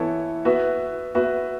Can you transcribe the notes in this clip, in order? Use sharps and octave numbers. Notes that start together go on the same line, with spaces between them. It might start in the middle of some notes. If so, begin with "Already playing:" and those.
Already playing: E3 B3 E4 A4 C#5
B3 F#4 B4 E5
B3 F#4 B4 E5